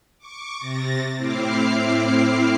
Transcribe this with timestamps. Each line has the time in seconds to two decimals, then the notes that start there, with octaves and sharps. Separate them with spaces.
0.19 C#6 D6
0.59 C3 A6 A#6
1.17 A2 C4 E4 D6 F6 C7